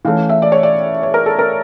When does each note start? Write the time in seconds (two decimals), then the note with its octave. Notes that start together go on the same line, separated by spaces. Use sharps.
0.05 E3 A3 C#4 F5
0.29 E5
0.42 D5
0.52 C#5
0.63 D5
1.03 C#5
1.14 A#4
1.26 A4
1.39 A#4